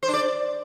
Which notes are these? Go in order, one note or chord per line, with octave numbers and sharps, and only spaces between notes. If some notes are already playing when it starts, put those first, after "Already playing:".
C5
D4
D5